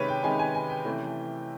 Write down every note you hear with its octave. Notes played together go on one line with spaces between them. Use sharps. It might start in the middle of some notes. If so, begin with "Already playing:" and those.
Already playing: C3 D#3 G#3 C#4 G4 B4 C#5
G5
C3 D#3 G#3 C#4 G#5
G#5
G#5
G5
C3 E3 A3 C#4